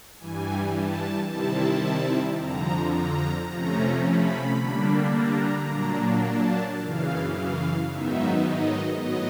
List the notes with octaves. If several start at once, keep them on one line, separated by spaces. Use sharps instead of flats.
G2 E3 G3 G#5
A5
C3 D#3 G3 C4 E4 A5
F2 D3 F3 A#5
A#5
C3 F3 A3 C#4 A#5
B5
D3 G3 A#3 D4
A#5
A#2 F#3 A#3 D4
A5
F#2 C#3 E3 F5
F5
G#2 D#3 F#3 B3 D#4 E5
D#5
A2 F#3 B3 D#5